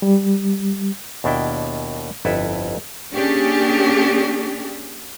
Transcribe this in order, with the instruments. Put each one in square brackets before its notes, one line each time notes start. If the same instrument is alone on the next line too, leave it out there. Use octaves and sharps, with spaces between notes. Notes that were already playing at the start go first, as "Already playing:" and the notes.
[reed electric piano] G3
[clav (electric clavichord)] D#2 B2 D4 E4 G5
G1 F2 E4 A4 B4
[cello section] A#3 C#4 D4 G4 G#4